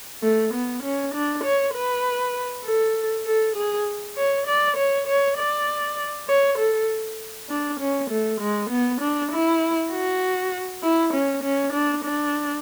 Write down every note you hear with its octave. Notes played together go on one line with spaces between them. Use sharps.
A3
B3
C#4
D4
C#5
B4
A4
A4
G#4
C#5
D5
C#5
C#5
D5
C#5
A4
D4
C#4
A3
G#3
B3
D4
E4
F#4
E4
C#4
C#4
D4
D4